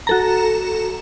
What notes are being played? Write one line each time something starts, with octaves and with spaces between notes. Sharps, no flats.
F#4 A4 A#5